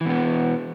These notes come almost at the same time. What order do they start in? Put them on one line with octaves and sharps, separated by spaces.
E3 B2 B3